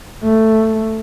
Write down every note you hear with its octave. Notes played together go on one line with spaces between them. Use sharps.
A3